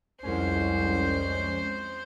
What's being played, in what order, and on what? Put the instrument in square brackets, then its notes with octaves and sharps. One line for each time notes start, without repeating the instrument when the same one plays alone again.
[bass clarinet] C2 [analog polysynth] F2 G#3 C#4 [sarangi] C5